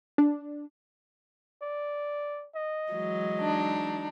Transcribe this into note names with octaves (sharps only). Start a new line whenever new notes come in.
D4
D5
D#5
E3 F#3 G#3
D4 D#4